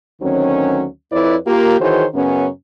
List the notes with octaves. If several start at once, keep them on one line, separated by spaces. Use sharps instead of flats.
D2 D#3 F#3 C4 C#4
F2 E4 B4 C#5 D5
A#3 F4 G4
D#3 E3 F#4 G#4 C5 C#5
F#2 C#3 B3 C#4